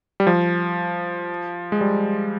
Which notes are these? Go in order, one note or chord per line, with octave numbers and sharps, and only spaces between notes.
G3
F3
G#3
G3